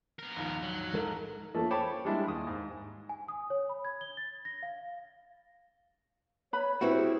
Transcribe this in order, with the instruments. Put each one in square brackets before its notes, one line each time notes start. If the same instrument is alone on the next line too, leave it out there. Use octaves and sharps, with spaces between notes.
[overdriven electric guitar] B3 A#4
[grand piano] A#1 D#2 G#2
[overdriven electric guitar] F#3
[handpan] G#3 A4 A#4
[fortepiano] F3 A3 A#3 C#4 A4
C5 C#5 G5 A5 B5 D6
G3 G#3 D4 E4
D#2 D#6
G#2
[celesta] G#5
D#6
C#5
B5
G#6
G7
A6
A#6
F5
[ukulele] B4 B5 [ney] C#5
[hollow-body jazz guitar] G3 C4 F#4 [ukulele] E4 [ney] B4
[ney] G#4